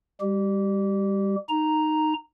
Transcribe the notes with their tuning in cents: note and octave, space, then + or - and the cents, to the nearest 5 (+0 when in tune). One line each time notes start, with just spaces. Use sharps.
G3 +25 G4 -25
D#4 -10 A#5 +0